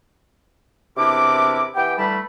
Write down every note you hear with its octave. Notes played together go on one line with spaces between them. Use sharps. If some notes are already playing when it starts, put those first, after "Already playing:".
E2 C3 D4 E4 A#4 D6
E3 B3 G4 G5
D3 E3 G3 A3 A5 B5